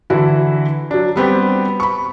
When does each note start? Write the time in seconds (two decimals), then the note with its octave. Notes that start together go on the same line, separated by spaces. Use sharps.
0.10 D3 E3 E4 F#4
0.91 F#3 D4
1.16 G3 B3 C4 G4
1.80 B5 C#6